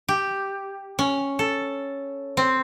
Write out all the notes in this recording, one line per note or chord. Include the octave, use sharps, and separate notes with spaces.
G4
C#4
A4
C4